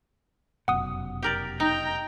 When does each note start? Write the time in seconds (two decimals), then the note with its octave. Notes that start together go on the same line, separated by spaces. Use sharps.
0.68 F1 F#2 B2 F#5 D#6
1.23 G4 A#4 D5
1.60 D#4 G5 A#5